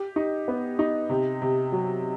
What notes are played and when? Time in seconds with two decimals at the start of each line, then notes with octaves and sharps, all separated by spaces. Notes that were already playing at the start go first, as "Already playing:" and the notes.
Already playing: G4
0.16 D#4
0.48 B3
0.79 D#4
1.10 C3
1.42 C3
1.72 F#3